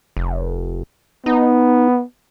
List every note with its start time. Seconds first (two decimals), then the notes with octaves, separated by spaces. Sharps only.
0.17 F1
1.26 B3 D#4